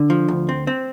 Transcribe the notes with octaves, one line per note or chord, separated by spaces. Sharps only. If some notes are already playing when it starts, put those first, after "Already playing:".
Already playing: D3
F3
D2
C4
C4